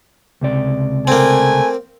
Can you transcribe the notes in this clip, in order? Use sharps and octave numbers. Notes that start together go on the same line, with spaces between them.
C#2 C3 D5
A3 A#3 C4 A#4 G#5